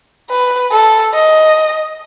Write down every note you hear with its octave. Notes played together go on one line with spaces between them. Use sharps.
B4
A4
D#5